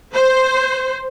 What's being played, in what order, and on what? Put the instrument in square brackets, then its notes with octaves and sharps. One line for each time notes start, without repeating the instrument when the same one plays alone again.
[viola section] C5